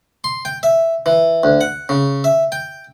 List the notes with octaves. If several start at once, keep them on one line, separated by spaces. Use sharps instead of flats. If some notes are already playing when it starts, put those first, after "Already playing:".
C6
G5
E5
E3
D2
F#5
C#3
E5
G5